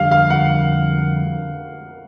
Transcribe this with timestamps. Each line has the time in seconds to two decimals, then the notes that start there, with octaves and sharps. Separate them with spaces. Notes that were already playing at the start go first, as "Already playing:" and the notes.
Already playing: F2 D3 G3 F5
0.11 F5
0.30 F#5